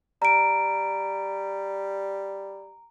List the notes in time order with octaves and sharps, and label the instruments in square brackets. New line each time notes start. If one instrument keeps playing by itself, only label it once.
[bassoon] G3 [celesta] A#5 D7